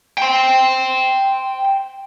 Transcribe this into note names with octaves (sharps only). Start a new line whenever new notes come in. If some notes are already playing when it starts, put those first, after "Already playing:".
G5 C6